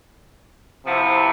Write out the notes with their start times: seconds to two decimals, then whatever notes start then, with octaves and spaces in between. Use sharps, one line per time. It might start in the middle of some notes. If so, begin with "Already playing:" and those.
0.86 C3 F3 B3 E4